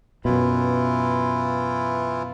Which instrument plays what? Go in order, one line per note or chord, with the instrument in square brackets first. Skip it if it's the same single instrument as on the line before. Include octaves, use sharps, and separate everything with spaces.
[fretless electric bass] F#2 B2 [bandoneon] E3 E4 F4